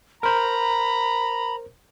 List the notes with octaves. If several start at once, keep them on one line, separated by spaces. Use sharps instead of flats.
A#4 C5 A#5 B5